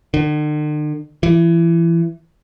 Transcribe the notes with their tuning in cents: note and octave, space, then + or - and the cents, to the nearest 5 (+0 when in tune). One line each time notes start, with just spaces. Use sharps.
D3 +45
E3 +25